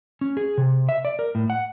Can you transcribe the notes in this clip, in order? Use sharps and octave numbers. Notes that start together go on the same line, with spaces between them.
C#4
G#4
C3
E5
D5
A#4
A2
F#5